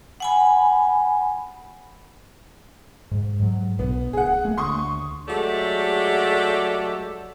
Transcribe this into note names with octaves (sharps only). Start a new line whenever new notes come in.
F#5 G#5 B5
G#2
G#2 F#3
B1 B2 B3
D1 G#4 F#5
A3 A#3
D2 C6 C#6 D#6
F#3 G#3 A3 G4 A4 D5